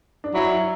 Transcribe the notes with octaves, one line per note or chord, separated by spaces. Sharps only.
D4
F#3 E4